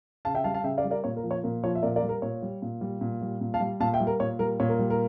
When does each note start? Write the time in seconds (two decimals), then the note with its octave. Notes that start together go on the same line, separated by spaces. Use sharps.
0.25 C#3 F5 A5
0.35 E5 G5
0.44 G3 F5 A5
0.54 F5 A5
0.64 C#3 E5 G5
0.78 D5 F5
0.84 G3
0.91 A#4 D5
1.04 A#2 C#5
1.16 A#4
1.23 F3
1.31 C#5
1.43 A#2 A#4
1.63 F3 C#5
1.75 E5
1.82 A#2 A#4 D5
1.96 A#4 D5
2.02 G3
2.09 A#4
2.22 A#2 C#5
2.42 G3
2.62 A#2
2.81 G3
3.01 A#2
3.21 G3
3.41 A#2
3.54 F5 A5
3.60 G3
3.80 A#2 F5 A5
3.93 E5 G5
4.00 G3
4.07 A#4
4.20 A#2 C#5
4.39 G3 A#4
4.60 A#2 C#5
4.69 A#4
4.79 G3
4.90 A#4